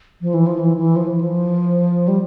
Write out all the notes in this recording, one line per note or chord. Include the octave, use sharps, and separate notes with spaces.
F3
E3
F3
E3
E3
F3
E3
F3
G3